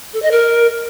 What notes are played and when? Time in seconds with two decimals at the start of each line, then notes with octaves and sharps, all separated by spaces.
0.14 A4
0.22 D#5
0.31 A#4